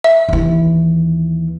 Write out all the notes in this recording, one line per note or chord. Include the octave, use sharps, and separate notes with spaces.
E5
D#2 E3